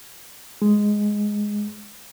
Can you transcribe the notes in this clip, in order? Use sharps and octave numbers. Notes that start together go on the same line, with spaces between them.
G#3